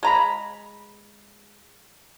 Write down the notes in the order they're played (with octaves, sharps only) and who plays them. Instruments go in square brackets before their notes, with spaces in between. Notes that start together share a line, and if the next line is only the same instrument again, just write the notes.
[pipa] G#3 A#5 B5